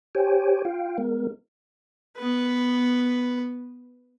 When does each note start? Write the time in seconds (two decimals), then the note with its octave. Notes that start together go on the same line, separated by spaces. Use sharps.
0.15 G4 C5 C#5 G5 G#5
0.65 F4 F5 G5
0.98 G#3 B3 A#4
2.18 B3 B4